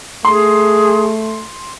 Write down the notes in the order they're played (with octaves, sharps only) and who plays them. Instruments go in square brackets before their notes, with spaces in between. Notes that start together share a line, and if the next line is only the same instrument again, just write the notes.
[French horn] A3 [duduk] G#4 [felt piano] C6